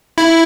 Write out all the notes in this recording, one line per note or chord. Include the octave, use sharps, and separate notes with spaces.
E4